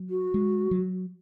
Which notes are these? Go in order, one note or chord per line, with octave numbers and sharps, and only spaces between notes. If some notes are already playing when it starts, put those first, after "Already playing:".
Already playing: F#3
F#4
G#3
F#3